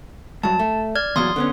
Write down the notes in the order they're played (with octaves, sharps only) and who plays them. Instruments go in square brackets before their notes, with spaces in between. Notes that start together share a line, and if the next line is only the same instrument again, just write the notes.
[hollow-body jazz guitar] G2 F#3 [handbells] A5
[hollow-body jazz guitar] A3
[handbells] D5 F6 G#6
[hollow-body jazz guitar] E2 A#2 F#3 [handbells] C6 D#6
[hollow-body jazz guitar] D3 B3 C#4